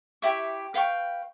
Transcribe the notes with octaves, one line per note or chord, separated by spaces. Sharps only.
E4 G4 E5 C#6
B4 F5 G5 C#6